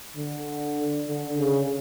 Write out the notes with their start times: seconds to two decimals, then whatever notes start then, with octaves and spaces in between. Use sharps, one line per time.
0.17 D3
1.08 D3
1.38 C#3